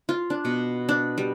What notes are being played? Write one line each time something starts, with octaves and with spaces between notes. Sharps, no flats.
F4
D4
B2
D4
G3